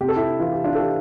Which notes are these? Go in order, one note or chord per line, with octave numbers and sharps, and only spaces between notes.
C3 G4
A4
E4 G4
E3 F4
G4
D4 F4
A4
E3 E4 G4